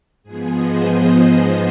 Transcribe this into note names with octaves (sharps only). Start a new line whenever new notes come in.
G#2 F3 B3 G#4
C5 D#5